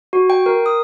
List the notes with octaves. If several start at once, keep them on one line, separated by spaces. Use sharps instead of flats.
F#4
G5
A#4
D#6